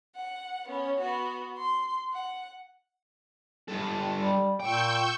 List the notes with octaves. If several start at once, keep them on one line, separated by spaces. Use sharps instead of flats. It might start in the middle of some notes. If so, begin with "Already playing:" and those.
F#5
B3 C#4
B3 F#4
C6
F#5
G2 A4
G3
A#2 G5 C#6 E6 G6